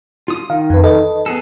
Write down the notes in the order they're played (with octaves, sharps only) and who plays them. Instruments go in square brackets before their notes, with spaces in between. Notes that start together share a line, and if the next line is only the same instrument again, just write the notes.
[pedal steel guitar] F4 D#6
[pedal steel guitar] D#3 [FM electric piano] F5
[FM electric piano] F2 B4
A4 B4 D#5
[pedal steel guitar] B3 G#4 A4